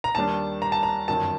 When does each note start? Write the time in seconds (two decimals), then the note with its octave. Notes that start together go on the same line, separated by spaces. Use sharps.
0.04 A#5
0.15 D#2 D#3 G3 D4 A5
0.62 A#5
0.72 A5
0.83 A#5
1.08 G1 F#2 D#3 A5